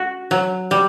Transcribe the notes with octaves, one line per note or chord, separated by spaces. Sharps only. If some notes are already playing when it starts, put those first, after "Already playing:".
Already playing: F#4
F#3
G3